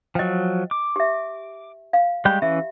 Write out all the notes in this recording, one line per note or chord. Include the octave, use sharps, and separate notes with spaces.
F3 F#3 D#5 G5
D6
G4 E5
F5
G3 G#3 G4 G5 B5
E3 C#4 E5